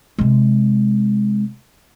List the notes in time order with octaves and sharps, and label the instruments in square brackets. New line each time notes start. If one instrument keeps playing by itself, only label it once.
[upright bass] C3 G#3